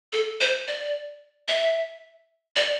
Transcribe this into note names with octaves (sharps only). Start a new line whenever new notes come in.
A4
C5
D5
E5
D5